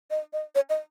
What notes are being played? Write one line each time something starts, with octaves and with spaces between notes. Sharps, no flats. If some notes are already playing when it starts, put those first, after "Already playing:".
D#5
D#5
C#5
D#5